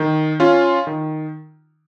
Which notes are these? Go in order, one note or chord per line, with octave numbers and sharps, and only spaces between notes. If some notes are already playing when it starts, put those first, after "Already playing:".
Already playing: D#3
C#4 F4
D#3